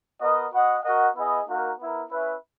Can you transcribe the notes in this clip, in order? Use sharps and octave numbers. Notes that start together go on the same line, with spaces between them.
B3 F#4 A#4 D#5
F#4 B4 D#5 F#5
F#4 A#4 D#5 F#5
B3 E4 G#4 D#5
A#3 D#4 F#4 A#4
B3 E4 A#4
C#4 E4 B4 E5